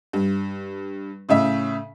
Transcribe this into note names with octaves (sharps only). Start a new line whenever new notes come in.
G2
A2 C#3 E5